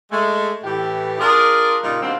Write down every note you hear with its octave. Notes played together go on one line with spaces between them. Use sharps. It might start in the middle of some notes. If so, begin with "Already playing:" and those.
G#3 A3
A2 E3 G4
D4 F4 G#4 A#4
A#2 C#3 G3 D#4 F4
B2 D#3 G3 A#3 C4 D4